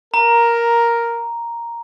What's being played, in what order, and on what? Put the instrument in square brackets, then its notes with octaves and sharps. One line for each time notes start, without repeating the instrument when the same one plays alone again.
[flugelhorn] A#4 [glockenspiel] A#5